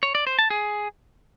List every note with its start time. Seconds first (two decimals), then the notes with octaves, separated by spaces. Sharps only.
0.03 C#5
0.15 D5
0.27 C5
0.39 A5
0.50 G#4